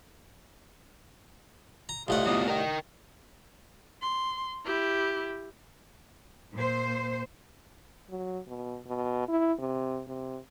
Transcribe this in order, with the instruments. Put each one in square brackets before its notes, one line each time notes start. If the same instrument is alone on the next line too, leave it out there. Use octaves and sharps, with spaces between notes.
[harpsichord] A#5
[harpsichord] C2 A2 F#5 [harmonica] A3 F4 D#5
[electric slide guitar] F#3 B3 F4 [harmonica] D5 D#5 D#6
[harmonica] D#4 [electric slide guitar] A#4 G5
[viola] C6
E4 G4
[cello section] A#2 C5
[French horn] F#3
B2
B2
E4
C3
C3